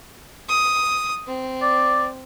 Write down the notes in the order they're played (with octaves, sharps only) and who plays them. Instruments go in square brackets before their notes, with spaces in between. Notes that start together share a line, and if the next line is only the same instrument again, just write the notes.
[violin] D#6
C4
[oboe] D5